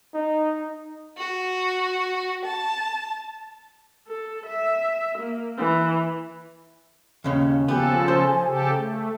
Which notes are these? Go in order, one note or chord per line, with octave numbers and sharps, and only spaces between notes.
D#4
F#4
A5
A4
E5
A#3
E3
D#2 C#3 C#4
C#3 F3 B3 G4 A4 G#5
C5
C#3 G4 A4
A3